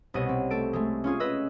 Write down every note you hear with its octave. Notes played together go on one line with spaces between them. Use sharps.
C2 B2 B3 C#5 D#5 D#7
C4
A3 A4 D7
G#3 A3
C#4 F4 G#4
B4 D#5 E6